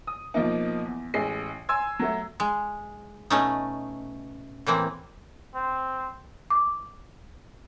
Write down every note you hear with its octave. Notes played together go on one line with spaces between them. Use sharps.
D#6
B2 F3 A#3 D#4
E2
A1 G#3 C7
G#5 C6 E6 G#6
F#3 A3
G#3
B2 A3 C#4 D#4
A2 E3 A#3 C4
C4
D6